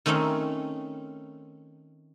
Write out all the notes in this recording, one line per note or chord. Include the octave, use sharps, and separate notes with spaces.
D#3 A3 C4 C#4 D#4